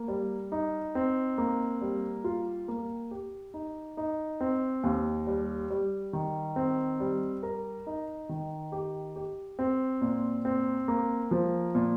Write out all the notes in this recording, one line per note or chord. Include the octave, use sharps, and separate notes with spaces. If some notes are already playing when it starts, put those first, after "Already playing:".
Already playing: A#3
G3
D#4
C4
A#3
G3
F4
A#3
G4
D#4
D#4
C4
D#2
G3
G3
D#3
C4
G3
A#4
D#4
D#3
G4
G4
C4
A#2
C4
A#3
F3
A#2